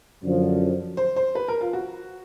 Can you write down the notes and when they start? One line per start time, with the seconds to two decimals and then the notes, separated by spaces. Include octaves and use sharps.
0.23 F#2 D3 F3
0.97 C5
1.16 C5
1.35 B4
1.48 A#4
1.61 F4
1.73 F#4